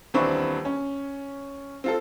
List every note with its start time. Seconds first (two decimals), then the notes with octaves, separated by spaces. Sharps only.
0.14 D#1 E3 C4 D4 B4 C#6
0.65 C#4
1.84 C4 F4 A4